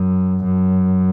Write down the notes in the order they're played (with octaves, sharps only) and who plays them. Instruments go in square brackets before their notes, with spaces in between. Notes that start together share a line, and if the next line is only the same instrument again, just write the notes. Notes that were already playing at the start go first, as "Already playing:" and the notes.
Already playing: [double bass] F#2
F#2